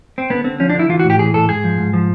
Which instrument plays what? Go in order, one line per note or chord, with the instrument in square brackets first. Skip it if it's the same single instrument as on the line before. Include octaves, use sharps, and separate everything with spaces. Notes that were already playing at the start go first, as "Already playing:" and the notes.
[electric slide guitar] C4
D3 B3
D3 C4
F3 C#4
D4
D3
E4
E3 F4
F#4
A2
G4
E3 G#4
A2 A4
G#2 G#4
F3
G#2
F3